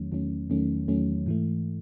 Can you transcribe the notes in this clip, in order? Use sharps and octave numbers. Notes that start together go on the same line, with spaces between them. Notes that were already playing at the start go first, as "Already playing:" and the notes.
Already playing: E2 D#3 F#3 A3 C#4
E2 D#3 F#3 A3 C#4
E2 D#3 F#3 A3 C#4
E2 D#3 F#3 A3 C#4
G#2 E3 A3